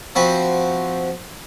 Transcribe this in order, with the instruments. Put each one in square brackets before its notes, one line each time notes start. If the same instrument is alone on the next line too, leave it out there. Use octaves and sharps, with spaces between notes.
[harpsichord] F3 C4 F#4 B4